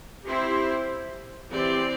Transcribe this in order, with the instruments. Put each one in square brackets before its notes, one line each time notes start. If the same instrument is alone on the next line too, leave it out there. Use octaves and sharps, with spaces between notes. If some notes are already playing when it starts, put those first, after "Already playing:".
[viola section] C4 E4 G4 C5
E3 C4 G4 D5